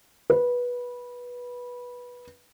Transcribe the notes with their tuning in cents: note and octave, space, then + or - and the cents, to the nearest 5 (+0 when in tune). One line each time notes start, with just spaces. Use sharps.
B4 -15